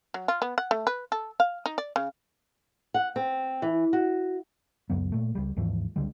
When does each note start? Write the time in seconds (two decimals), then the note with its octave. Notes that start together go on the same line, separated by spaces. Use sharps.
0.14 F#3
0.28 F4
0.42 B3
0.58 F#5
0.71 A3
0.87 B4
1.12 A4
1.40 F5
1.66 D#4
1.78 D5
1.96 C#3
2.94 F#5
3.16 C4
3.62 E3
3.93 F#4
4.90 C#2 F#2 F#3 B3
5.12 A#2 A3
5.35 C#2 G3
5.56 D#2 G#2 E3 F3
5.96 C#2 D3 G3 G#3